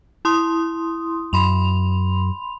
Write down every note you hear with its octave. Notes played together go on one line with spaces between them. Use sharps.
E4 C6 D#6
F#2 B5 C6 F7